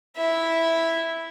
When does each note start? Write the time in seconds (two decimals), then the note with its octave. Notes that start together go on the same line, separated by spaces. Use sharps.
0.17 E4 E5